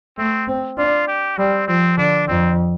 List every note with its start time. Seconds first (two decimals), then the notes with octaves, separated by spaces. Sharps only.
0.18 A3 C4
0.48 C4
0.78 D4 F4
1.07 G4
1.38 G3 C4
1.68 F3 C4
1.97 D3 D4
2.27 F2 C4